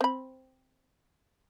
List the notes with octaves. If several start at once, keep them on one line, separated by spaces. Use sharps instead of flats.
C4 B5